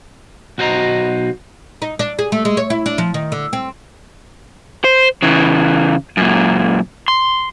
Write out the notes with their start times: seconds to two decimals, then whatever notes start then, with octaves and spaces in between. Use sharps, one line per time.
0.58 B1 F#4 C5 D#5 A#5
1.82 D#4
1.99 D4
2.19 G#4
2.32 A3
2.45 G#3
2.57 C#5
2.70 E4
2.86 D4
2.98 F3
3.14 D#3
3.32 D3
3.53 C4
4.84 C5
5.22 C#3 E3
6.17 F#2 A#2
7.08 C6